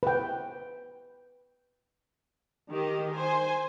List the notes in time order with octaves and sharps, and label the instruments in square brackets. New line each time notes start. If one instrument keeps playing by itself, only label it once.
[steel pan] B4 G5
[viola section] D#3 G4 D#5
C5 G#5